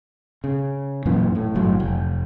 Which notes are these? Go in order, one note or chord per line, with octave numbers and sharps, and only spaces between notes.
C#3
F#2 A#2 E3
A2
G1 A2 F#3
F1